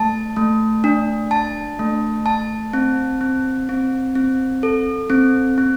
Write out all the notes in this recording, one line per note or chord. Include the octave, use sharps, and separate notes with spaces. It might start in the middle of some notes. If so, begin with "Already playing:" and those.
Already playing: A3 A5
A3
D4
A5
A3
A5
C4
C4
C4
C4
A4
C4
C4